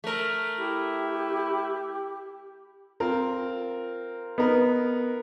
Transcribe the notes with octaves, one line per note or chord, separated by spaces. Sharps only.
A3 A#4
E4 G4
C4 F4 A#4
B3 D#4 A#4 B4